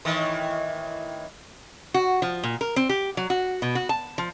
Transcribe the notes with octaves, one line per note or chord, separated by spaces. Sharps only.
A2 D#3 E3
F#4
F3
A#2
A#4
C4
G4
F#3
F#4
B2
F#4
A5
F3